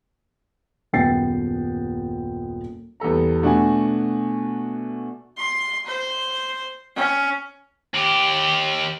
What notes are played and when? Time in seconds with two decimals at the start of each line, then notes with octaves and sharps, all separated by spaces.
0.93 D#1 F#2 B3 G5 A6 C7
3.00 E2 G3 A4 A#5
3.42 B2 A3 D4 F#4 F#5 G#5
5.37 C6
5.86 C5
6.96 C#4
7.94 D#2 G4